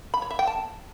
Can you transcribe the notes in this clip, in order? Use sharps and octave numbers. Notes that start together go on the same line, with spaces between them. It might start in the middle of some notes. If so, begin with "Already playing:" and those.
B5
C#5
E5
G5
A5